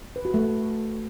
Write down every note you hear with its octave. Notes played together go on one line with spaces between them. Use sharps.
B4
F#4
A3